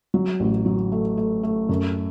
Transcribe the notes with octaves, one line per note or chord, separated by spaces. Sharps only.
F#3
A1
F#3
A3
A3
A3
F#2